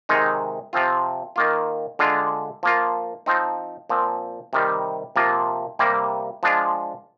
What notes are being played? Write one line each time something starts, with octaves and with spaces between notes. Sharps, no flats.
C3 D#3 G#3 D#4
C3 F3 C4 F4
D#3 A#3 F4
D3 G#3 D4 F4
F3 A#3 F4
F3 C4 D#4
A#2 F3 C4
C3 D#3 G3
C3 F3 A#3 F4
C3 G3 A#3
F3 G#3 D4 F4